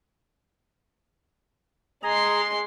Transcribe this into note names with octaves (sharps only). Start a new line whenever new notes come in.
G#3 G#4 A#5 C6